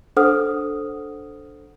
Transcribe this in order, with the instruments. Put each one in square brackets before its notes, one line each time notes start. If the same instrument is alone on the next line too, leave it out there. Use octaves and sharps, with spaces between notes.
[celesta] D4 A4 C5 F#5 D#6 F6